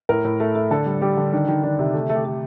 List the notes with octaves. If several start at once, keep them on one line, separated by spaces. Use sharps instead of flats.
A2 A#4
A2
A3
A3
D3 A4
G3
G3 G4
D3
D#3 D4
D#3
D#3 D4
C3
A3
A3
G4
A3